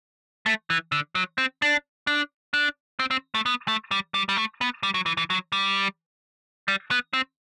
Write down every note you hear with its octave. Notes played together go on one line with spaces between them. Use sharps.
A3
E3
D3
F#3
C4
D4
D4
D4
C4
C4
A3
B3
A3
G3
G3
G3
A3
B3
G3
F#3
E3
E3
F#3
G3
G3
B3
C4